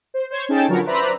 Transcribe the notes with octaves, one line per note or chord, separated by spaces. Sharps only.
C5
C5 C#5 G#6
C#4 D#4 G#4 A4 G5 A5
D3 F3 F#3 A#4 B4 C#5
B4 C5 D5 E5 A#5 B5